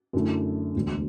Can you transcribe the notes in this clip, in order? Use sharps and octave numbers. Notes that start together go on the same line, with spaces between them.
F#2 D3 A3 E4
E1 D2 D3